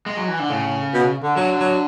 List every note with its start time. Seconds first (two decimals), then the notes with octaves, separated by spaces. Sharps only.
0.06 G#3
0.17 F#3
0.28 E3
0.39 D3
0.50 A2 C#3
0.94 B2
1.23 D3
1.36 D3 F#3
1.59 F#3